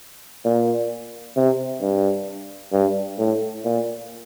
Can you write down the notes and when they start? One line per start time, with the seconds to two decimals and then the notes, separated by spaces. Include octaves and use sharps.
0.45 A#2
1.36 C3
1.81 G2
2.72 G2
3.18 A2
3.64 A#2